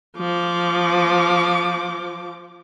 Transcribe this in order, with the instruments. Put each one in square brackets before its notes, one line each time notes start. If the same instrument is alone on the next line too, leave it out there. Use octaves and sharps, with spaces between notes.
[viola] F3 D6